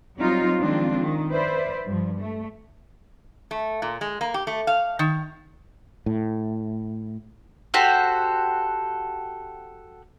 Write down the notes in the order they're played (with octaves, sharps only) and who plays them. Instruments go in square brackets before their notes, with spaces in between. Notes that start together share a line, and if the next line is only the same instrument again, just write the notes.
[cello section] F#3 G3 C4 D#4 F4
D#3 F3 G#3 C4 D4 F4
D#3
B4 C5 D5 E5
G2 F3
A3
[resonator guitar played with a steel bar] A3
A#2
G#3
A#3
G4
A3
F5
D#3
[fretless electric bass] A2
[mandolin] F#4 G4 A4 C5